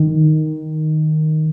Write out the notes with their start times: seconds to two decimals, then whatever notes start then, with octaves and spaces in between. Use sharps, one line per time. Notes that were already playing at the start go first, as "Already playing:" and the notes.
Already playing: D#3